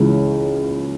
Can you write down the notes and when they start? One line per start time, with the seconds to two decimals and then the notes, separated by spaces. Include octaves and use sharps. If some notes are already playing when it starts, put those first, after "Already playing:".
Already playing: C#2 C#3 E3